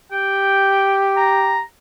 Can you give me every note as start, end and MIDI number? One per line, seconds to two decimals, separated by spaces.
0.12 1.63 67
0.12 1.02 79
1.17 1.60 82